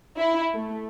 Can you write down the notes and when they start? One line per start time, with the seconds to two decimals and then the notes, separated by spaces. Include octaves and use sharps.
0.18 E4
0.55 A3